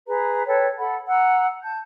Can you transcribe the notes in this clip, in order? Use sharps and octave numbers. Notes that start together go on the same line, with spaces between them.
G#4 B4 A#5
A4 B4 C#5 G5
A4 F#5 B5
F#5 A#5 E6
A5 G6